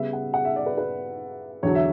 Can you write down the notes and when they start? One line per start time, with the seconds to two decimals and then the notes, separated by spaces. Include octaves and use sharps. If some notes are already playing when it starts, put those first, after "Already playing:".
Already playing: C#3 G3 B3 E5
0.13 F#5
0.34 F#5
0.45 E5
0.56 D5
0.66 B4
0.78 B4
1.63 E2 D3 F#3 C#5
1.75 E5